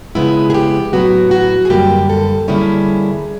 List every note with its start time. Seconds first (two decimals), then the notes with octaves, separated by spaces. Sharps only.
0.15 C#3 F3 G#3 B3 E4
0.50 G#4
0.54 G4
0.93 A2 F#3 B3 F#4
1.31 F#4
1.65 G#4
1.70 F#2 D3 G3 A#3 G4
2.10 A4
2.48 D3 G3 A#3 C#4 E4 G#4